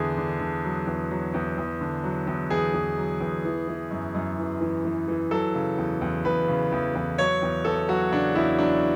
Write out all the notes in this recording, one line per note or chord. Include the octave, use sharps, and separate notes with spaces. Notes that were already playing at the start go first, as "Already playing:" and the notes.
Already playing: E2 D3 G#4
D3
D3
F#3
E2
F#3
E2
E2
D3
F#3
E2
E2 G#4
E2
F#3
E2
E3
E3
F#2
F#2
E3
E3
E3
E3
F#3 A4
C#3
E2
E2
E2 B4
C#3
E2
E2
F#3 C#5
E2
E2 A4
F#3 F#4
C#3 D4
E2 E4
F#3 D4